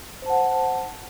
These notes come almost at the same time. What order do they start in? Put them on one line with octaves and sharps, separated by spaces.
C5 A5 F#5